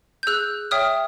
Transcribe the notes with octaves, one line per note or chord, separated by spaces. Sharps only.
G6
G#4 E6 F#6
C#5 E5 G5 D#6 F6